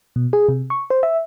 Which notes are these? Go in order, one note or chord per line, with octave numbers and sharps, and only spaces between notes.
B2
G#4
C3
C#6
C5
E5